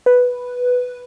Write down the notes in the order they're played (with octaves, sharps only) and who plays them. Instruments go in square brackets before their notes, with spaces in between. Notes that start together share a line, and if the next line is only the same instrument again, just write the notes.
[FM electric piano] B4